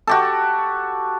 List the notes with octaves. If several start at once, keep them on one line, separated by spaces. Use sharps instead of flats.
F#4 G4 A4